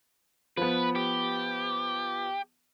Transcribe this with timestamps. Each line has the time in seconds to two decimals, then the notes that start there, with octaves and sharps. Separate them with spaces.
0.57 F3 B3 B4
0.96 G4